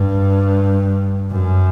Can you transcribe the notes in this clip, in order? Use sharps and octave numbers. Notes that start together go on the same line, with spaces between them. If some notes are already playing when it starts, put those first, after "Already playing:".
Already playing: G2
F#2